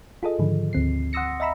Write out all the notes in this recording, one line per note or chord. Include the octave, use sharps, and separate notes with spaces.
F4 G#4 A4 D#5
G#2 D3 D#3 F3
D2 C4 C7
F#5 C6 D#6 E6 A#6 C#7
D#5 E5 A#5 B5 E6